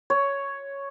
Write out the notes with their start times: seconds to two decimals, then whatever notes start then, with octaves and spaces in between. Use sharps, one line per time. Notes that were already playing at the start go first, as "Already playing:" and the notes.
0.10 C#5